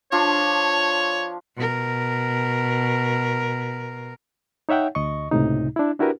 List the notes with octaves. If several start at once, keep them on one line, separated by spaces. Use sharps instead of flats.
F3 D4 F4 C#5
B2 A#4
D#4 C#5 E5 F#5 G5
D2 D#5 C#6
C#2 A2 C3 D#4
D4 E4
D4 E4 F#4 G4 A#4 B4